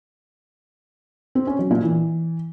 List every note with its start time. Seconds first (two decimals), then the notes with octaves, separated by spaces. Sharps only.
1.35 C4
1.47 C#4
1.59 F#3
1.71 A#2
1.82 E3